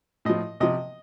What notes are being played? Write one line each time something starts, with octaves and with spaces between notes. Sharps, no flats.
A2 F3 D#5
C3 F3 D#5